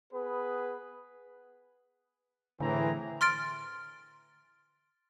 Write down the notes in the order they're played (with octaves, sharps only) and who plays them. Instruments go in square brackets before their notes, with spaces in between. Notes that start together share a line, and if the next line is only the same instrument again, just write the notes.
[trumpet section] B3 G#4 B4
[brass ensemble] A2 E3 [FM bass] D3 [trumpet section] C4 G#4 A#5
[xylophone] C6 F6 A6 D7